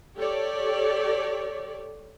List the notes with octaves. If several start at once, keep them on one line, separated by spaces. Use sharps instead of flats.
G4 A4 C#5 D5